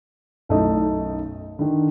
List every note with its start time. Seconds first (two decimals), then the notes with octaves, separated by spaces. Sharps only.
0.49 B1 F#2 A3 D#4 E4 D#5
1.59 D3 D#3